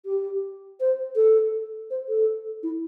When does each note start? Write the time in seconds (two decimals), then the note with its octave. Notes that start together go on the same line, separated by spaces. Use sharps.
0.05 G4
0.80 C5
1.16 A4
1.90 C5
2.09 A4
2.63 E4